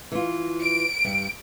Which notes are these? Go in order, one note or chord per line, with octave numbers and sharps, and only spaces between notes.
E3 F4
D7
G2 G3